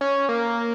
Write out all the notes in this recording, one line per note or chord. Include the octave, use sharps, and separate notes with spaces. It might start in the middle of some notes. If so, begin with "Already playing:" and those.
C#4
A#3